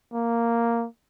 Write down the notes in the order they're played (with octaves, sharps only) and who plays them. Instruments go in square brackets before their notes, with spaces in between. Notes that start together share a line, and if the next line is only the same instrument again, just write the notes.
[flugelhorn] A#3